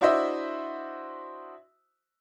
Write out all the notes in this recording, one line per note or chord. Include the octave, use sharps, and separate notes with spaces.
D4 E4 F#4 C5 D#5 E5